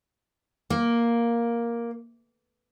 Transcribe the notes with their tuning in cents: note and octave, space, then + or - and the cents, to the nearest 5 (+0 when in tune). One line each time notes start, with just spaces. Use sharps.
A#3 +5